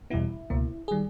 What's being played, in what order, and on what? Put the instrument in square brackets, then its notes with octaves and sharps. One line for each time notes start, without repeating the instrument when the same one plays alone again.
[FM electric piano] E2 B2 G3 B3 E4
C#2 B2 A#3
D#3 G3 G#4